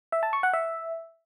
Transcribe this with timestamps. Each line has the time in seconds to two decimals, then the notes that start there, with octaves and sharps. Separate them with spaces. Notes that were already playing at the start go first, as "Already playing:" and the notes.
0.12 E5
0.23 A5
0.33 C#6
0.43 F#5
0.53 E5